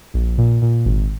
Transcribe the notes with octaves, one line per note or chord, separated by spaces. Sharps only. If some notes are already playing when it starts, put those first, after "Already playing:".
A#1
A#2
A#2
G#1